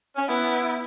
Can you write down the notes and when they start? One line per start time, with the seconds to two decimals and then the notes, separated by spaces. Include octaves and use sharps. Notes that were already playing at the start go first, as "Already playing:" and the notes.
0.16 C#4
0.28 B3 E4